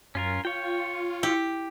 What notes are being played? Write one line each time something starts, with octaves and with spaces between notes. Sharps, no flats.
F#2 C#4 F4 A#4
F4 C#5 G5
E4 G4